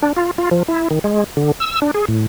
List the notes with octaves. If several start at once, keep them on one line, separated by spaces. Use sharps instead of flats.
D4
F4
F4
F3
E4
D#3
G#3
D3
E6
D4
G#4
A2